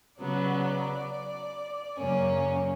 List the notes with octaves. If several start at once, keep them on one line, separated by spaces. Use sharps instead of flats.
C#3 F#3 B3 D5
F#2 C#3 F#3 A#3 C#4